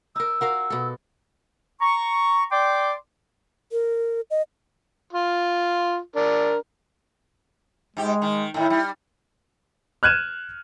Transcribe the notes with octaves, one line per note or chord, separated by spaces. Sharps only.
D#4 A#4 E6
F#4 A#4 F5
B2 A4
A#5 C#6
D5 G5 C6 D6
A#4
D#5
F4
D4 A#4
G#2 G#3 G4
D#3
A2 D#3 E4
G3
F6 F#6 G#6 D#7 E7